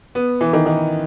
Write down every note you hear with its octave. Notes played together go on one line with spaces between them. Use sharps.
B3
E3
D#3
D#3